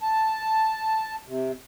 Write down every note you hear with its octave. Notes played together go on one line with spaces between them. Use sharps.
A5
C3